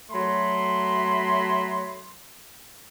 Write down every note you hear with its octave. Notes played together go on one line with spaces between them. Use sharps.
F#3 A3 B5 C6